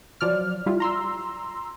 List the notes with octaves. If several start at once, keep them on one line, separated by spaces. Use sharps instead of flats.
F3 F#3 D5 F6
G3 E4 F4
A#5 C6 E6